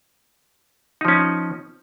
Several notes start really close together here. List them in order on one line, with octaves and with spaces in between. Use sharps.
D#4 F3 C#4